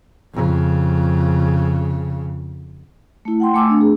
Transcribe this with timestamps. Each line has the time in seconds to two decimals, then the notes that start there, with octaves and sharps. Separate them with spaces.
0.33 F2 C#3
3.25 A3 E4
3.40 F#5 G5 C6
3.54 A3 G#5 D6 E6
3.68 A3 C4 D4
3.81 G#4